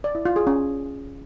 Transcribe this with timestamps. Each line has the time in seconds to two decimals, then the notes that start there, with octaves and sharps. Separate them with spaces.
0.04 D5
0.15 E4
0.25 F4
0.36 G#4
0.47 C#4